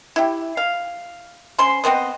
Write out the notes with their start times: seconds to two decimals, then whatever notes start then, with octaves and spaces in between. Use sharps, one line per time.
0.16 E4 G4
0.57 F5
1.58 C#4 C5 C6
1.84 B3 C4 C5 D#5